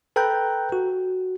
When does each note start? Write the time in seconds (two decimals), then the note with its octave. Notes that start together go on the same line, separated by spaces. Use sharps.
0.16 A4 B4 G5 A#5 F#6 G6
0.72 F#4